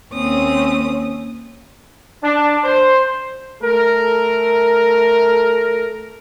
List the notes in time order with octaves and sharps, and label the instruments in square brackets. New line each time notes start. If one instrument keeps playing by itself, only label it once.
[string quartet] D#2 C4 C#4 D#6
[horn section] D4
C5
A3 A4 A#4